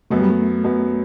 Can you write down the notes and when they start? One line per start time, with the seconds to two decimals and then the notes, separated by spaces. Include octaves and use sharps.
0.11 F#2 F#3 A3 B3
0.21 G3
0.30 A3
0.64 F#2 F#3 B3